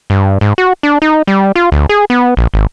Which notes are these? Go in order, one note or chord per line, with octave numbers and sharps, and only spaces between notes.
G2
G#2
F#4
D4
D#4
G3
F4
D2
G#4
B3
A#1
G#1